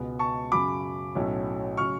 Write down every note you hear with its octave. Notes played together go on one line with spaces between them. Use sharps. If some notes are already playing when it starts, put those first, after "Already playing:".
Already playing: C#2 B2 G#3 B3
A5 C#6
F#2 C#3 F#3 B5 D6
B1 A2 F#3 A3 C#4
C#3 F#3 C#6 F6